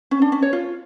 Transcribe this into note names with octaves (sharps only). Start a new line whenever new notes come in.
C#4
D4
C#4
C#5
F4